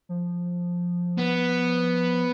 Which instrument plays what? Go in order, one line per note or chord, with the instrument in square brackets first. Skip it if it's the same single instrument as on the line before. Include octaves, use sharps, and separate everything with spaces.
[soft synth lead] F3
[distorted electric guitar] B3